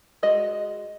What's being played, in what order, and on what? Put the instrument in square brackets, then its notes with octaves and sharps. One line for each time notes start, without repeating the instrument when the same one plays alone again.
[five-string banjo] G#3 F#4 D#5